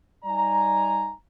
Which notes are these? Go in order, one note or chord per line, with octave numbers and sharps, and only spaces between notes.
G3 D#4 D5 G#5 A#5